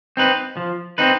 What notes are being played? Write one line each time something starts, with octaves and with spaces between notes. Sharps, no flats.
C4 D#4 B4
F3
C4 D#4 B4